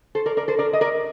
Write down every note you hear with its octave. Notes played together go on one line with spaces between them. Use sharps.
A4 C5
A#4 D5
A#4 D5
A4 C5
A#4 D5
D#5
A#4 D5